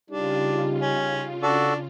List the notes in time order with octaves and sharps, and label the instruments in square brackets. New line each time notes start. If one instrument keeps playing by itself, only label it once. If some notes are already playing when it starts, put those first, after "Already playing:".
[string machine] C#3 F4 [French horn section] G3 D#4 G4 [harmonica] D4
[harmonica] C#4
[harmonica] D4 [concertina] F#4 A4